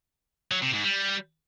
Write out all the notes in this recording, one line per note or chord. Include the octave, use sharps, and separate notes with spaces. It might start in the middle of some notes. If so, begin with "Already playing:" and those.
F#3
C3
G#2
G3